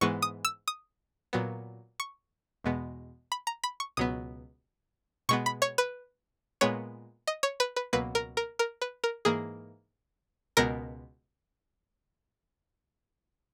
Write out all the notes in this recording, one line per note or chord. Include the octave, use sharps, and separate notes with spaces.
G#2 E3 G#3 B3 C#6
D#6
E6
D#6
A#2 F#3 B3
C#6
E2 B2 G#3 B3
B5
A#5
B5
C#6
C#2 B2 F#3 B3 D#6
B2 G#3 B3 C#6
B5
C#5
B4
A#2 G#3 B3 C#5
D#5
C#5
B4
B4
C#2 B2 F#3 A#3 B4
A#4
A#4
A#4
B4
A#4
G#2 E3 A#3 G#4
C#2 B2 G#3 B3 A#4